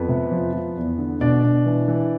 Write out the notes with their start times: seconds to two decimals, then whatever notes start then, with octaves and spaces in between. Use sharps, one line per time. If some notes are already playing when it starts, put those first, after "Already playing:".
Already playing: F2 B3 B4
0.09 C3
0.31 F3
0.53 F3
0.77 E2
0.98 D3
1.21 B2 D4 D5
1.44 B2
1.66 E3
1.88 E3